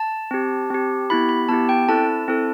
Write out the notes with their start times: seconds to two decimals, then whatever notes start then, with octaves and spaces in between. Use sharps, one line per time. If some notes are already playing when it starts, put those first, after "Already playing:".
Already playing: A5
0.31 C4 G4
0.70 C4 G4
1.10 B3 E4 G4 B5
1.29 B5
1.49 B3 E4 G4 A5
1.69 G5
1.89 C4 E4 A4 A5
2.28 C4 E4 A4